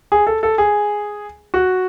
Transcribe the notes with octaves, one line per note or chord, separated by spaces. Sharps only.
G#4
A4
A4
G#4
F#4